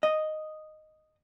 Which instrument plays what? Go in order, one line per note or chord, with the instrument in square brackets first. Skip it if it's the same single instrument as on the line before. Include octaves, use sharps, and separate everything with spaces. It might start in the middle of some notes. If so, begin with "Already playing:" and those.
[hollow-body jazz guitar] D#5